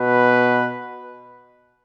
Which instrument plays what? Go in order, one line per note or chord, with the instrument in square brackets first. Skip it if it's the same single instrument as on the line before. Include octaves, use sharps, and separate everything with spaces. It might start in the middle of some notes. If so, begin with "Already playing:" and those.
Already playing: [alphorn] B2 [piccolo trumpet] B4